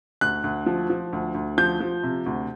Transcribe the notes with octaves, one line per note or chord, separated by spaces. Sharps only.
D2 F#6
D2
F3
F3
D2
D2
F3 G6
F3
C3
D2